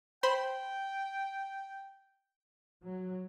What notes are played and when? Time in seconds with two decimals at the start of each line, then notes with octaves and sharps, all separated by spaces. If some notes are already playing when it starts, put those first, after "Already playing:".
0.23 C5 G5 B5 C6
2.83 F#3